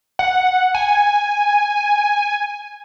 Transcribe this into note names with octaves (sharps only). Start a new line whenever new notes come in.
F#5
G#5